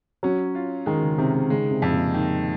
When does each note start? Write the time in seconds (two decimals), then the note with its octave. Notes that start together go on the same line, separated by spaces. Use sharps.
0.23 F#3 C#4
0.55 F4
0.86 D#3 G#3
1.03 C#3
1.18 C3 D#3
1.34 C3
1.50 C#3 G#3
1.71 C3
1.82 F2
1.93 A#2
2.14 D#3